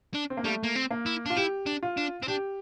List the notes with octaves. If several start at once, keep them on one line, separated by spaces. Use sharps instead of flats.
D4
C4
A#3
G3 A3
A#3
C4
A#3
E4
D4 F4
E4 G4
D4
F4
D4
C4
D4 G4